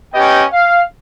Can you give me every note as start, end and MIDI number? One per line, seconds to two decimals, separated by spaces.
0.13 0.43 59
0.13 0.43 61
0.13 0.43 67
0.13 0.43 75
0.13 0.43 79
0.52 0.80 77